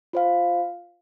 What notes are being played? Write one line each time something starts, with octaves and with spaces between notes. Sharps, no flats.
F4 C5 F5